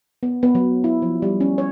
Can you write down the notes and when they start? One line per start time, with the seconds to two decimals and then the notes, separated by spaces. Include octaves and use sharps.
0.23 B3
0.43 B3
0.55 F#3
0.84 E4
1.02 F3
1.22 G3
1.40 C#4
1.58 C#5